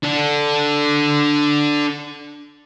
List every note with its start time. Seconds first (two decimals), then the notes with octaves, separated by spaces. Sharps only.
0.03 D4 A4